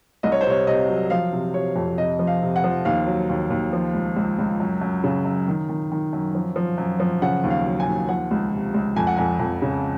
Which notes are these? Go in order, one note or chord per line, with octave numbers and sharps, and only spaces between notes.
C2 D#5
C#5
C5
C3 C#5
C3 D#5
F#3
F3 F5
C3
C3 C#5
F2
C3 D#5
F3
F5
C3
F#5
F3
D#2 F5
F#3
D#2
D#2
F3
C#2
C#2
C#2
F#2
F#2
C#3
F#2
D#3
D#3
D#3
F#2
F3
F3
F#2
F3
C#3 F#5
D#2
F5
F#3
G#5
D#2
F3 F#5
C#2
C3
C#2
F2 G#5
F#5
F2 G#5
F2
C#3